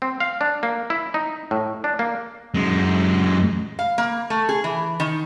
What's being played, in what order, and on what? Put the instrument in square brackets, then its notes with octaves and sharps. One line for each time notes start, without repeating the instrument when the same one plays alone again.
[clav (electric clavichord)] C4
F5
D4
A#3
E4
D#4
A2
D4
A#3
[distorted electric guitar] F#2 G#3
[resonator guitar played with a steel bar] F5
A#3
A3
G#4
E3
D#3